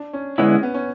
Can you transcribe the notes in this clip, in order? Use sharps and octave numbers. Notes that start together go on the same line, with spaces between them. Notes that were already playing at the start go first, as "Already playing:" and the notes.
Already playing: D4
C#4
D3 G#3 B3 C#4 E4
C#4
B3
C#4